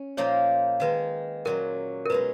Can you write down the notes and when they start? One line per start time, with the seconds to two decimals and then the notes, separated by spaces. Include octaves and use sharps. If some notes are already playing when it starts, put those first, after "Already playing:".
Already playing: C#4
0.17 A#2 F3 A#3 D#4 C#5
0.80 D#3 G#3 D#4 B4
1.45 A#2 F#3 C#4 A#4
2.06 A#4
2.10 B2 G#3 D#4 B4